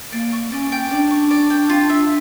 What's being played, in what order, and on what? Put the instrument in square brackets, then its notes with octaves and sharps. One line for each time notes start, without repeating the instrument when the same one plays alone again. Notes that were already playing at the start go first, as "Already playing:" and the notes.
[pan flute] A#3 [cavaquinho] D5
[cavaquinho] C#6
[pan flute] C#4 [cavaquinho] D5
[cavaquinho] G5
[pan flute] D4 [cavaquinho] D5
[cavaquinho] C#6
D5
G5
F4
E5